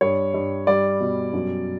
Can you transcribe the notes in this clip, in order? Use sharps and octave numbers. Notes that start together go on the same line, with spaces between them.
G2 C#5
G2
G3 D5
B2
F#2